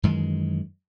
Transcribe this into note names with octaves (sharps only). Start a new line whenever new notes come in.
F#2 D#3 E3 G#3